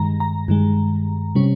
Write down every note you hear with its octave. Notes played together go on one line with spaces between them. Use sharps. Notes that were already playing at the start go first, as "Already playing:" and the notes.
Already playing: G2 D#3 G#3 A#5
A#5
G2 D#3 G#3
C3 G3 C#4